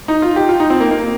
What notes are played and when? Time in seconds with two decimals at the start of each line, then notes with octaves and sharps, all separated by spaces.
0.08 D#4
0.22 F4
0.36 G4
0.49 F4
0.60 D#4
0.70 C4
0.80 A#3
0.91 A#3